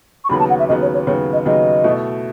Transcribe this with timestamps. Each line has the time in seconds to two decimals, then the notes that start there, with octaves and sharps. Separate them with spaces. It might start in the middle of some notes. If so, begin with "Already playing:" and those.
0.24 C#6
0.29 D#2 C#3 F#3 B3 B5
0.39 A5
0.49 F#5
0.59 E5
0.68 D#2 C#3 F#3 B3 D#5
0.82 C#5
0.94 C#5
1.07 D#2 C#3 F#3 B3 C#5
1.33 D#5
1.45 D#2 C#3 F#3 B3 D#5
1.84 B2 A3 E4